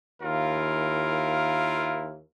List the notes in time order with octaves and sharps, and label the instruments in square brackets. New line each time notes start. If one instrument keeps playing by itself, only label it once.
[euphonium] D#2 [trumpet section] E4 F4 A#4